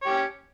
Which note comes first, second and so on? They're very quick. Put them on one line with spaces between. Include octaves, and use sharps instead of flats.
C#5 G4 C#4